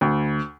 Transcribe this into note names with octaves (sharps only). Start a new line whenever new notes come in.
D2